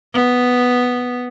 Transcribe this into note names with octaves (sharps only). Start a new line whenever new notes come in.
B3